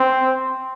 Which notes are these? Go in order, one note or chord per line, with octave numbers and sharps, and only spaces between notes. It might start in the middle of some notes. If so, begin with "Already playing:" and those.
Already playing: C4